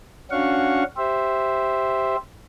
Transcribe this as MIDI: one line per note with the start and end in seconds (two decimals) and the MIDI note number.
0.31 0.84 61
0.31 0.84 62
0.31 0.84 66
0.31 0.84 77
0.31 0.84 78
0.31 0.84 85
0.97 2.16 67
0.97 2.16 72
0.97 2.16 76